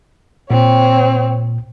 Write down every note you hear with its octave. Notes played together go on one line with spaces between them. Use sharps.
A#2 C4 C#5